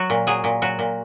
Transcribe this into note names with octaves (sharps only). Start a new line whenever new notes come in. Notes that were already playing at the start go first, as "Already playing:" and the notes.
Already playing: F#3 F#4
A#2
F#3 G#4
A#2
F#3 F#4
A#2